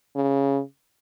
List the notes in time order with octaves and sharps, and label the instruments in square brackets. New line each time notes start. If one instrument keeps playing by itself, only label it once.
[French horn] C#3